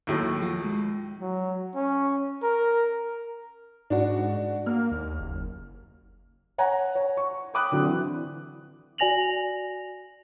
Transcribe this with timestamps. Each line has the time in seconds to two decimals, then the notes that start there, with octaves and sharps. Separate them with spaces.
0.07 D#2 A2 F#3 C#6
0.42 F3 F4 F#4
0.64 G#3
1.21 F#3
1.75 C#4
2.43 A#4
3.90 G#2 D4 F#4
4.66 A#3 F6
4.92 D#2
5.20 F#1
6.58 C#5 F#5 G#5 A#5
6.95 C#5
7.17 C#6
7.54 G5 B5 D6 D#6 F#6
7.72 D3 F#3 C4
7.86 E3
8.98 F#4 D5 G#5 A#6 F7 F#7